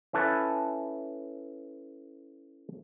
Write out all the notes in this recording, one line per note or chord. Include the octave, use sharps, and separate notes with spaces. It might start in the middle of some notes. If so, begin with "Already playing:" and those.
C#4 E4 A4 B4